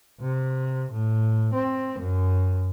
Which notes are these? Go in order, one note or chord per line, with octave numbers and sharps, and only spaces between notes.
C3
A2
C4
F#2